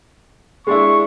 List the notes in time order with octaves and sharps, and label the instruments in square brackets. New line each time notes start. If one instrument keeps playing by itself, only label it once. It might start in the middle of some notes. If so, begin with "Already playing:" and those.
[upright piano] G#3 D4 E4 [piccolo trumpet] C#6